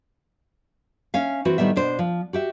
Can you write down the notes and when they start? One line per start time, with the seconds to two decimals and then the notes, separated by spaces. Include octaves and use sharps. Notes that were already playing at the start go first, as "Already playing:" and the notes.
1.14 C#4 E5 F5
1.45 E3 C4 F#4
1.58 A2 D#3 G3 B3 E5
1.76 B2 D4 C5
1.99 F3
2.33 F#4 G4 E5